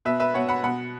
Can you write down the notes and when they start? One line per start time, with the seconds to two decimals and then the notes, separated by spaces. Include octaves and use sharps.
0.05 B2 B4 E5
0.20 B4 E5
0.34 B2 C#5 F#5
0.49 F#5 B5
0.64 B2 F#5 B5